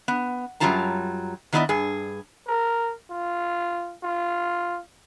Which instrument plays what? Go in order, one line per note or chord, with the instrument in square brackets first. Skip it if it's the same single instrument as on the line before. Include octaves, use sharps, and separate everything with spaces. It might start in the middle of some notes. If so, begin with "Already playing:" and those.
[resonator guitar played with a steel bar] B3
F#2 F#3 G3 F4 A5 A#5
D#3 F#3 B3 E4 D5 D#5
G2 G#4
[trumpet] A#4
F4
F4